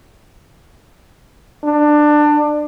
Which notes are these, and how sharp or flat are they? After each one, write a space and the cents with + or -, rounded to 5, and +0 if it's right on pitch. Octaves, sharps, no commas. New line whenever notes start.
D4 +20